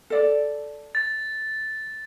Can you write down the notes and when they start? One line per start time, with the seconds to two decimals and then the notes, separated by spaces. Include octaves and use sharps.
0.10 A4 D5
0.95 A6